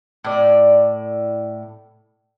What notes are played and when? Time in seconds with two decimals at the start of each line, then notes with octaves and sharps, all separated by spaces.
0.24 A2 D5